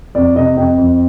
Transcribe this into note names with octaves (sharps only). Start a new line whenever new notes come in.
F2 D5
C3 D#5
F2 D#5 G5
F2